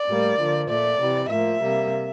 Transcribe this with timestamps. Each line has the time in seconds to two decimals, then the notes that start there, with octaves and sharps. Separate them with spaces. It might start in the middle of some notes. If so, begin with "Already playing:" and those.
Already playing: D5
0.08 A2 G3 A#3
0.39 D3 F3 A#3
0.69 A#2 A3 D5
1.00 C3 E3 G3
1.30 A2 F3 A#3 E5
1.61 C3 G3 A#3